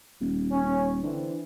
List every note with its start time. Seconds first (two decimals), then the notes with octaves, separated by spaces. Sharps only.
0.21 D#1
0.52 C#4
1.03 D3 E3 C4